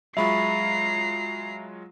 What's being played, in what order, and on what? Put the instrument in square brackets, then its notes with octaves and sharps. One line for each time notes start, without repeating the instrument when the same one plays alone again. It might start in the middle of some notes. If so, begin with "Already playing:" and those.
[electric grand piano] F#3 G#3 F4 [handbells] E5 B5 C#6 [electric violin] A#5 C7